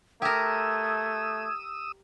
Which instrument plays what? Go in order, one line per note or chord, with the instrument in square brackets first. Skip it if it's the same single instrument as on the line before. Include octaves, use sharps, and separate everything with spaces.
[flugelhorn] A3 [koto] G4 A#4 [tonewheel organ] D#6 E6 [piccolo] G#6